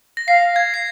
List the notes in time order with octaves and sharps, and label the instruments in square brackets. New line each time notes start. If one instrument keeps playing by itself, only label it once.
[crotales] A#6
[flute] F5 [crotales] C7
[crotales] G#6
C7